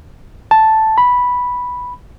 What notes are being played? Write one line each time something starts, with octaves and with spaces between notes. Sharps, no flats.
A5
B5